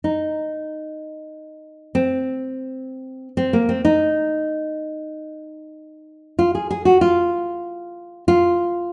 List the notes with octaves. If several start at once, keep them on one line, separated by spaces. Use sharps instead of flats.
D#4
C4
C4
A#3
C4
D#4
F4
G#4
G#4
F#4
F4
F4